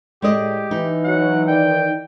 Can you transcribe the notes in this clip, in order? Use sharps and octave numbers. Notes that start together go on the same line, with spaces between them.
A2 G#3 G4 D5 D#5
E3 D#4
F#3 F#5
D#3 D5 G5